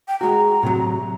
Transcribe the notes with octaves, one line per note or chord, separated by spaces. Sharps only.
G5
G#3 F#4 A#5
A2 C3 F#3